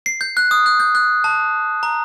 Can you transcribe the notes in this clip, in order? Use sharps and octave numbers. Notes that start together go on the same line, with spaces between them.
C7
G6
F#6
D#6
F#6
G6
F#6
A5
A#5